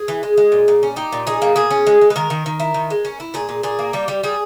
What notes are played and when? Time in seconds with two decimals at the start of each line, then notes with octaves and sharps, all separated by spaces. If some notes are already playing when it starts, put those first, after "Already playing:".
Already playing: G#4
0.08 E3
0.23 G#3
0.37 G#3
0.52 A#2
0.68 A#2
0.83 C#4
0.96 D#4 G4
1.12 A#2
1.27 D#4 G#4
1.42 A#3
1.56 B2 G#4
1.71 C#4
1.87 G#3
2.01 G#3
2.10 B4
2.16 D#3 A#4
2.30 D#3
2.46 D#3
2.60 E4
2.74 D#3
2.90 G#3
3.05 C#4
3.20 E4
3.34 A#2 G#4
3.49 A#2
3.63 A#2 G#4
3.79 A#3
3.93 G3 G4
4.08 G3
4.23 G3 G#4